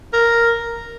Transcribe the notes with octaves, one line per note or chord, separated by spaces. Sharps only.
A#4